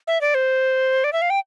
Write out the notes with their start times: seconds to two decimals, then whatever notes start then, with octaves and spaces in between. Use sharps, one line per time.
0.07 E5
0.21 D5
0.35 C5
1.04 D5
1.13 E5
1.22 F5
1.30 G5